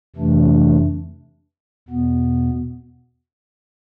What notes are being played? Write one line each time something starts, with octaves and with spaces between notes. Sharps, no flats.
F2 C3 E3 A3 D4
E2 B2 B3